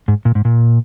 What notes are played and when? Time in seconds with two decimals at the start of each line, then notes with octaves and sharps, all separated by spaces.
0.08 G#2
0.25 A#2
0.35 G#2
0.45 A#2